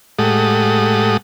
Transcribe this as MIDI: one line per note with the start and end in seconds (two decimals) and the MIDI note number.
0.19 1.17 45
0.19 1.17 56
0.19 1.17 67
0.19 1.17 69
0.19 1.17 78
0.19 1.17 87